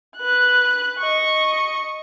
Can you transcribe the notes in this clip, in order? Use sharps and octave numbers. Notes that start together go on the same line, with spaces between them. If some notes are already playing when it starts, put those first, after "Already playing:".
B4 F#6
D#5 C#6